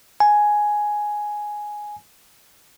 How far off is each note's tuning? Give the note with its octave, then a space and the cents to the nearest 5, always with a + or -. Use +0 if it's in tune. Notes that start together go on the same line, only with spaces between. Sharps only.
G#5 +5